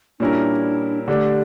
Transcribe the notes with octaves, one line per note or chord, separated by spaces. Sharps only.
A#2 G3 C#4 D4 E4 A#4
D3 A3 D4 G4